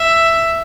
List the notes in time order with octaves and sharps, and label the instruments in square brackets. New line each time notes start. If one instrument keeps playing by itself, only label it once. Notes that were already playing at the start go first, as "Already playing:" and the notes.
Already playing: [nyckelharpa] E5